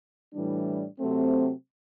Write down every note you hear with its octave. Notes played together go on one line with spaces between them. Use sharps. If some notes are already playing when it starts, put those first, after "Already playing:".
A2 E3 G3 D4
C3 F#3 A3 C4